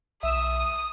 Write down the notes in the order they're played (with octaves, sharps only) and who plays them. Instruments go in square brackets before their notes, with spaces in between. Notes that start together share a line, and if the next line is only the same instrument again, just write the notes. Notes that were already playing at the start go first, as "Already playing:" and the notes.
[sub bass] B1 [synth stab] E5 E7 [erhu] D#6